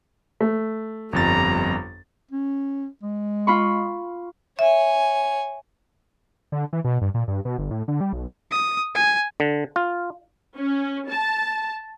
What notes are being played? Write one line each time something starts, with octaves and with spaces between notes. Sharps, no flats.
A3
G1 F2 G3 A#5 A6
C#4
G#3
F4 B5 C#6
C#5 E5 G#5
D3
E3
B2
G2
A#2
G2
B2
G1
A2
D3
G3
B1
D#6
G#5
D3
F4
C#4
A5